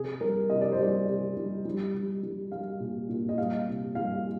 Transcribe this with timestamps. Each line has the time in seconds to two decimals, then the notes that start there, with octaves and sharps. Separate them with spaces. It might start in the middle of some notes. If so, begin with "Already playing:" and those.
Already playing: C3 G#4
0.21 G3 A#4
0.50 C3 D#5
0.61 D5
0.72 C5
0.78 G3 D5
1.08 C3
1.37 G3
1.65 G3
1.94 G3
2.23 G3
2.52 G3 F5
2.80 A#2
3.09 A#2
3.29 D#5
3.38 G3 F5
3.68 C3
3.95 G3 F5